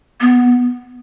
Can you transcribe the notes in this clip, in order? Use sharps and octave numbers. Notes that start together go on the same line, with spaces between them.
B3